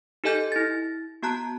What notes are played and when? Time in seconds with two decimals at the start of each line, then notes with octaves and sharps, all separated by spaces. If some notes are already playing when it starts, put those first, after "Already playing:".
0.24 D#4 G4 A4 D#5 G#5 G6
0.52 E4 A6
1.23 B3 F#4 A5 A#5 F#6